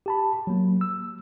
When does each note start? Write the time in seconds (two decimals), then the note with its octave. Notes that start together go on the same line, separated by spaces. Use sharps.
0.06 G4 A5 B5
0.47 F#3 A#3
0.81 E6